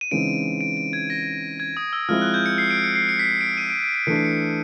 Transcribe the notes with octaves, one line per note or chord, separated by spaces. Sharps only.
D#7
C#3 E3 G#3 C4 D#4 D7
D7
D7
G#6
A#6
G#6
D#6
E6
F3 G#3 C4 E4 F6
F#6
G6
C#7
C7
D7
C#7
C7
C#7
B6
C7
D7
D#7
D7
D7
D7
E3 A3 D4 C#7
C7
C#7